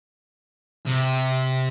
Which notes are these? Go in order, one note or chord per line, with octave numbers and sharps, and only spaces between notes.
C3